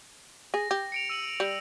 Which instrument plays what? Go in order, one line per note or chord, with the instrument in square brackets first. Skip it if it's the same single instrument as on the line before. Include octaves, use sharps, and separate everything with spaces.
[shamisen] G#4 [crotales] A#6
[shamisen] G4
[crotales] C#7 D7 F7
E6 D#7 F#7
[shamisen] G3